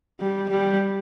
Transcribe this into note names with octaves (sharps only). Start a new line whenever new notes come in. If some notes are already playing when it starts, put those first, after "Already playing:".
G3
G3